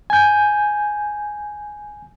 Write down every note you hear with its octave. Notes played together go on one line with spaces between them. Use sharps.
G#5 G6